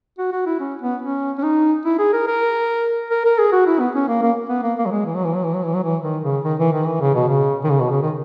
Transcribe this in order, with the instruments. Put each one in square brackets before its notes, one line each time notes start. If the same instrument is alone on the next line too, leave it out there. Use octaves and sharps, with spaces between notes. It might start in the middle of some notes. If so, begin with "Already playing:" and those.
[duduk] F#4
F#4
E4
C#4
B3
C#4
C#4
D#4
E4
G#4
A#4
A#4
A#4
A#4
G#4
F#4
E4
B3
C#4
A#3
A#3
B3
A#3
A#3
F#3
G#3
E3
F#3
E3
F#3
E3
F#3
E3
F#3
E3
D#3
C#3
D#3
E3
D#3
E3
C#3
B2
C#3
D#3
C#3
B2
C#3
D#3